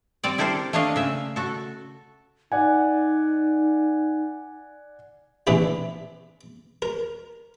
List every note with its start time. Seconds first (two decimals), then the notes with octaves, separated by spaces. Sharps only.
0.23 G3 C4 D5
0.38 E4 G4 A4 A#4 C5
0.73 A3 A#3 D4 D#5 F5
0.96 C#3 E5
1.36 F#4 A4
2.52 D#4 D5 F#5 G#5
5.47 A2 C3 E3 D4 E4
6.82 A#4